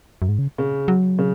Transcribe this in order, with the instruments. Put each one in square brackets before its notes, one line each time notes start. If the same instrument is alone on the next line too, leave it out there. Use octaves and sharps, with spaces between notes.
[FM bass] F#2
G#2
C#3
[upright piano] C#3
[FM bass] F#3
[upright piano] C#3